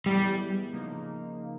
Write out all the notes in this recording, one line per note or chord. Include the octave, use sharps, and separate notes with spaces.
A2 E3 G3 G#3 B3 E4
C#3 F3 A#3 D#4